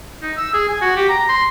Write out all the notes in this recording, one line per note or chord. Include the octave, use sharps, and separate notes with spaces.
D#4
E6
G#4
G#5
F#4
G4
A#5
C6